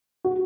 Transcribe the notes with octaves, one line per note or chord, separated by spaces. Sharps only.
F#4